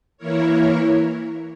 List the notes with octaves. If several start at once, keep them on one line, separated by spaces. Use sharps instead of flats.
E3 A#3 E4 A#4 C#5